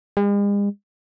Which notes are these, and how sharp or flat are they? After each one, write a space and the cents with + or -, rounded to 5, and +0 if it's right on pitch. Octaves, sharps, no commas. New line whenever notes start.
G#3 -45